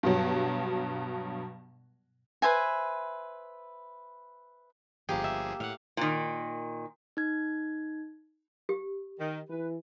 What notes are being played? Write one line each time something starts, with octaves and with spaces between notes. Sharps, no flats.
G2 B2 F#3
B4 C5 E5 G#5
G1 F3 A#3 G4 G#4
E5
A2 F5 F#5
A#2 D#3
D#4 G#6
G4
D#3
E3 B4